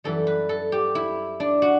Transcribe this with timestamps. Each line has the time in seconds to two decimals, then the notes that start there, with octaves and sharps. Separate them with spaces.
0.04 F#2 E3 G3 A4
0.27 B4
0.49 A4
0.72 G4
0.95 E4
1.40 D4
1.62 F#4